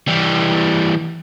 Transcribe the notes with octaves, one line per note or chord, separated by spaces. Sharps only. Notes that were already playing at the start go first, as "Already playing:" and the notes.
E3 G3